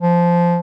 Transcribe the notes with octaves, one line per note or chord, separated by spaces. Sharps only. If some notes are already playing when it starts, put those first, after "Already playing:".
F3